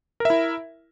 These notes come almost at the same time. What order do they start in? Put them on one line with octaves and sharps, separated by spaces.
A#4 E5 E4